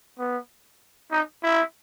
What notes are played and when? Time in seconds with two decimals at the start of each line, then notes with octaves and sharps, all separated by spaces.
0.18 B3
1.11 D#4
1.43 E4